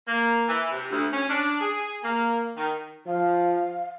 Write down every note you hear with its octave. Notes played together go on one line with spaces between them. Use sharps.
A#3
E3
C3
D2
C#4
D4
G#4
A#3
D#3
F3 F5